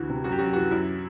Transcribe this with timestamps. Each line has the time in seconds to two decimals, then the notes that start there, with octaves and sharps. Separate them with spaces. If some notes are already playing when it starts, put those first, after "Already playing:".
Already playing: D2 E3 F#4
0.10 C3
0.24 F#2 F#4
0.32 G4
0.39 F#2 F#4
0.46 G4
0.53 E3 F#4
0.71 F#2 E4